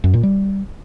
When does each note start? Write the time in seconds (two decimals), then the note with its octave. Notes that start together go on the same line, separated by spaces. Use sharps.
0.04 F#2
0.14 A#2
0.23 G3